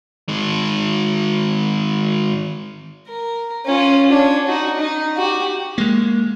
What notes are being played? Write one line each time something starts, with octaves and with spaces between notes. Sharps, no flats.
D#3 G#3
A#4
C#4 F4
D4 C#5
D#4 F#4
D#4
F#4 G4
G#3 A#3